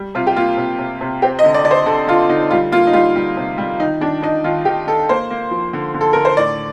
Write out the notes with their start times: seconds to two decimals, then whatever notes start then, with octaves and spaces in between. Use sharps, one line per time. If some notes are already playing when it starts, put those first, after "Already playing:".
Already playing: G3
0.15 C3 F4
0.27 G4
0.36 A#3 F4
0.57 C3
0.79 C3
1.01 C3
1.22 C4 G4
1.39 D#5
1.44 D3
1.54 D5
1.64 D3 D5
1.71 C5
1.86 D3 A4
2.07 D3 F4
2.29 D3 D#4
2.50 G3 F4
2.72 A#3 F4
2.87 D#4
2.93 G3 F4
3.16 G3
3.37 C3
3.58 G3
3.80 D#3 D#4
4.01 D#3 D4
4.22 D4 D#4
4.44 D#3 F4
4.65 D#3 G4
4.87 D#3 A4
5.09 A#3 C5
5.30 A#3
5.51 F3
5.73 D3
5.94 D3
6.01 A4
6.13 D3 A#4
6.25 C5
6.37 A2 D5